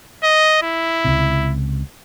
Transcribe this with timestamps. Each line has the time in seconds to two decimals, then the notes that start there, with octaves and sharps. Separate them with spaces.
0.24 D#5
0.62 E4
1.05 C#2 C3